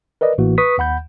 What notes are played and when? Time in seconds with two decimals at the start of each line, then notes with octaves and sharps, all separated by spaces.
0.21 A#4 B4 D5 D#5
0.38 A1 A2 E3 A#3 F#4
0.58 B4 C#6 D#6 B6
0.78 D#2 F#5 B5 G6